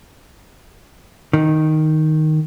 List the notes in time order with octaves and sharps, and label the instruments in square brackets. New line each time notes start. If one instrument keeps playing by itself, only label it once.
[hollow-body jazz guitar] D#3